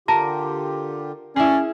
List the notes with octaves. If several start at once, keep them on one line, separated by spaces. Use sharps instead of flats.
D3 F4 G4 A#4 A5
C#4 E4 G#4 C#5 D5